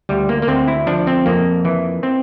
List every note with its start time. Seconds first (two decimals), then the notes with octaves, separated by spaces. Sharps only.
0.09 D2 G3
0.29 A#3
0.42 A#3
0.48 D2 C4
0.68 E4
0.87 F3 D4
1.07 C4
1.26 F2 A#3
1.65 E3
2.03 C4